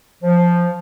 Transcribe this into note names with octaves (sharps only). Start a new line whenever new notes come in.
F3